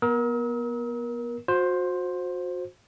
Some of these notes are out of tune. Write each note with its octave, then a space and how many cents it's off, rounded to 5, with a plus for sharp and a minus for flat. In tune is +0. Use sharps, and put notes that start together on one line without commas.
B3 -25 A#4 +25 E6 -45
F#4 -35 C5 +5